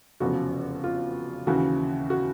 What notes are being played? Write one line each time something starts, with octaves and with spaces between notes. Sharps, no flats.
F1 E2 C#3 F3 F#4
F4
D#2 C#3 E3 F#4
F#4